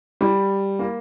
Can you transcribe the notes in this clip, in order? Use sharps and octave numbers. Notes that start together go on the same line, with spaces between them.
G3
A#3